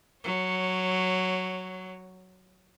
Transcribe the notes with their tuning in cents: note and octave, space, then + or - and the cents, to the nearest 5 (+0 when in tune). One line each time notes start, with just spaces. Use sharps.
F#3 +0 C#5 -10